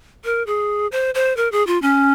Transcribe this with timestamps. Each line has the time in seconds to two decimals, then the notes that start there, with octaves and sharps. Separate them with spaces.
0.24 A#4
0.46 G#4
0.92 C5
1.14 C5
1.37 A#4
1.52 G#4
1.67 F4
1.82 C#4